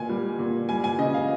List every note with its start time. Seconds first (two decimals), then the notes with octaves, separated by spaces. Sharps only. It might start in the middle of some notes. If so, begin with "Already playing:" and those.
Already playing: A#2 G#5
0.09 G3
0.39 A#2
0.69 G3 G#5
0.84 G#5
0.98 C#3 D#5
1.14 F5